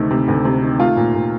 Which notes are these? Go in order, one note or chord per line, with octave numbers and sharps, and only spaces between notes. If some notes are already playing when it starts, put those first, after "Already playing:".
Already playing: D2 C3 D#3 A3
C3
D2
C3
D#3
A3 F4
A#2
A#2